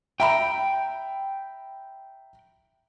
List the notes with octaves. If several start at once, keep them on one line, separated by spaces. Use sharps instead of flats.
E5 G5 A#5 B5